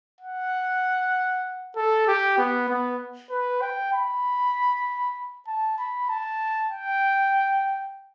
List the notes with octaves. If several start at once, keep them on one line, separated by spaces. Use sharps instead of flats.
F#5
A4
G4
B3
B3
B4
G5
B5
A5
B5
A5
G5